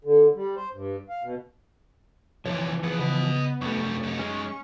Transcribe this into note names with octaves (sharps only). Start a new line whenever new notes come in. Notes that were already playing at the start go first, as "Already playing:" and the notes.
D3
G3
C5
G2
F5
B2
C2 A#2 E3 F3 C#5
C2 B3 G#4 F#5
C#3 D#5 B5
C2 F#2 G3 A3 C#6
F#2 D#4
G#3 C#4